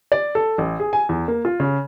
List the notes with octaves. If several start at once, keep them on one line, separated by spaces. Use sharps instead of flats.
D5
A4
A1
G#4
G#5
E2
A#3
F4
C#3